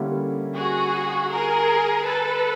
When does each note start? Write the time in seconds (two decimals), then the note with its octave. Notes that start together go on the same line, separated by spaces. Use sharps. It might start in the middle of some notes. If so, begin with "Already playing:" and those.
Already playing: D3 G3 A#3 C#4 E4
0.55 F#4 G#4
1.30 G#4 A#4
2.04 A4 B4